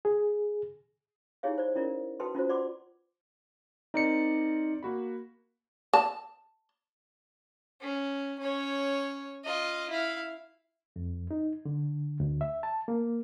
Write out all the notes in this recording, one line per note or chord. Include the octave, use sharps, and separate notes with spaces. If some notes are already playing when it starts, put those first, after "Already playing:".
G#4
D#4 E4 G4 G#4 C#5 F5
C5 D5
C#4 E4 A#4 D5
F#4 A4 B4 G5 A5 C6
C#4 F4 F#4 C5
D5 F#5 C6 D6
C4 D#4 A#4 D5 C#7
A#3 F#4 B5
A5
C#4
C#4 C#5
F4 D#5
E4 F5
F2
D#4
D3
D2
E5
A5
A#3